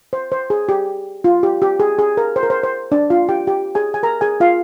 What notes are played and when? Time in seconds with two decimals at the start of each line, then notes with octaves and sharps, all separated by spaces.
0.13 C5
0.32 C5
0.50 G#4
0.69 G4
1.24 F4
1.43 G4
1.62 G4
1.80 G#4
1.99 G#4
2.17 A#4
2.36 C5
2.43 A#4
2.50 C5
2.63 C5
2.92 D4 D5
3.10 F4 F5
3.29 G4 G5
3.47 G4 G5
3.75 G#4 G#5
3.94 G#5
4.03 A#4 A#5
4.21 G#4 G#5
4.40 F4 F5